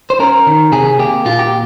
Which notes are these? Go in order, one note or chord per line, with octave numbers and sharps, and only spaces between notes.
C5
C#4 A#4
D#3
C3 G#4
A#3 G4
A#2 F4
G4